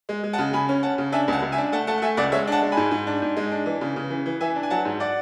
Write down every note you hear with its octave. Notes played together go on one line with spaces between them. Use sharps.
G#3
G#3
F#5 A5
C#3
C#3 G#5 B5
C#4
C#4 F#5 A5
C#3
D4 E5 G#5
C#2 F#5 A5
C#2
E5 G#5
D4
A3 F#5 A5
A3 F#5 A5
F#5
A3 E5 G#5
C#2 D5 F#5
G#3 C#5 E5
D4 F#5 A5
G#3
G#5 B5
G#2
G#2
D4
G#2
G#3
D4
E3
C#3
C#3
E3
E3
E3 E5 G#5
D4
G#5
F#3 F#5 A5
G#2
D5 F#5